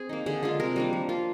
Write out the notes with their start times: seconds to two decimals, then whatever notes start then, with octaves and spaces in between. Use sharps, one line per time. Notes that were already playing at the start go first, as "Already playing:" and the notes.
Already playing: C4 G#4
0.09 A#3 D#4
0.26 D3 G#4
0.43 G#3 D4 F4
0.60 C3 A#4
0.76 G3 A#3 D4
0.93 F3
1.09 A#3 F4